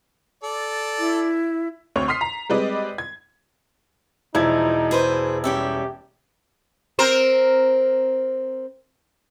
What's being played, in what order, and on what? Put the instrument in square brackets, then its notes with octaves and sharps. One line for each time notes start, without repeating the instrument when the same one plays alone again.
[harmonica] A4 D5
[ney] E4
[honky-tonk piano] D2 C4 C#5 C#6
C6 D#6 F6 B6 C7
A#5
G3 G#3 C4 B4 D5 D#5
G#6
[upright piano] E1 E4 G#6 [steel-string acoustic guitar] F3 [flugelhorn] D#4
[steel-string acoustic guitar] G#4 B4 C5
[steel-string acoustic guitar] G3 C#4 E5 [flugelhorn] G4
[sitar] C4 A#4 C5